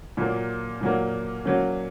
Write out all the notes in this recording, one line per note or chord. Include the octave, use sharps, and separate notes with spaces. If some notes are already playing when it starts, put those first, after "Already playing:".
A#2 F#3 A#3
A#2 F#3 A#3
F#3 A#3 C#4